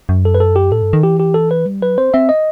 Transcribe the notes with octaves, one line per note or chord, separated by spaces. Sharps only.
F#2
A4
B4
A4
G4
A2 A4
G2
D#3
E3 G4
G4
A4
B4
G3
F#3 B4
C4 C5
C4 E5
D#5